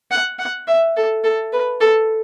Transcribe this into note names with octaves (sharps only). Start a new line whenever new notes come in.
F#5
F#5
E5
A4
A4
B4
A4